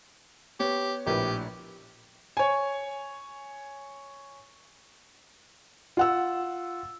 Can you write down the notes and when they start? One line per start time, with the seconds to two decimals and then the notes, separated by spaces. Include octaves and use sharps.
0.60 B3 G4 C#5
1.07 A#1 A2 G4 B4
2.37 C#5 G#5
5.97 F4 F#5 E6